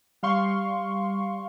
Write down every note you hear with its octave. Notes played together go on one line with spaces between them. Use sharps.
G3 F5 C6 C#6